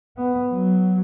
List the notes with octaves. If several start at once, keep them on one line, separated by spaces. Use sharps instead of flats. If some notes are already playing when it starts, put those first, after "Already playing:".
B3
F#3